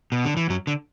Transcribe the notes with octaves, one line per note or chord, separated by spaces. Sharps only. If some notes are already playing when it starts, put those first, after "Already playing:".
B2
D3
E3
F#2 F#3
D3